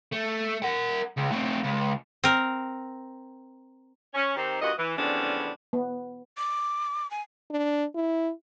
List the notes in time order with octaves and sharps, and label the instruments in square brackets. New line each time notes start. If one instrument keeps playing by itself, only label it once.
[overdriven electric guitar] A3
A#4 F#5
C#2
A3 C4
C#2
[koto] C4 A#4
[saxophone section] C#4
D#3 C4 G4
G2 A#2 F#4 D#5
E3
F2 C#3 E3 G3 B3 D4
[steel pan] B3
[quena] D6
G#5
[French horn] D4
E4